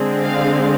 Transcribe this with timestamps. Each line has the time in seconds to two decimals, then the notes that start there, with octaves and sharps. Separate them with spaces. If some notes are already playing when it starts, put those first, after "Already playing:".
Already playing: D3 G#3 C4
0.22 F5